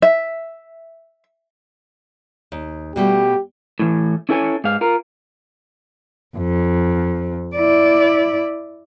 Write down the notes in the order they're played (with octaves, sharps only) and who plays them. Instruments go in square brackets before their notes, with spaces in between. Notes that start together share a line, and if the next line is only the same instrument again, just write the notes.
[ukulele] E5
[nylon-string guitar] D#2
[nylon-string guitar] B2 G3 A3 [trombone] G4
[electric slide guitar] A2 E3
C#4 E4 A4 C#5 G#5
G#2 F5
F4 A#4
[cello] F2
E4 D5